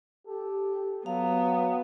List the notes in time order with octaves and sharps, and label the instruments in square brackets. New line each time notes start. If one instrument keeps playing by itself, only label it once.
[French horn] G4 [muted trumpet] A4
[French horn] F#3 [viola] B3 [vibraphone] F5 [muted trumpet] A#5